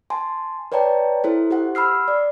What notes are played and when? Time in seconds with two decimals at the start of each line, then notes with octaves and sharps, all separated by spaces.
0.10 G#5 A5 C6
0.72 B4 C#5 D5 G5 A5 A#5
1.24 E4 A4 C5
1.51 G4 C5 F#5
1.75 B5 E6 F6 C7
2.08 D5